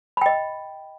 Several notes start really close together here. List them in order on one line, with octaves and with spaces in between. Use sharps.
B5 G5 D#5